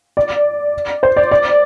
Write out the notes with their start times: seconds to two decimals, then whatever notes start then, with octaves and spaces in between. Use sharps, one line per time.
0.17 D5
1.03 C5
1.17 D5
1.31 D5